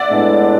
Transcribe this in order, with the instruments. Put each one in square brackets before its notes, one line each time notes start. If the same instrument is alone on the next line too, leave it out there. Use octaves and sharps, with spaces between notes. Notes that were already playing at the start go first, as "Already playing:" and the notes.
Already playing: [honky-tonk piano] D5 E5 F#5
[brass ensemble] A2 G#3 B3 D4